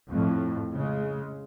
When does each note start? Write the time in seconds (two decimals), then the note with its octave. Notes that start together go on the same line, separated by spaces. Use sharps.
0.10 F2 A2
0.73 C#3 G#3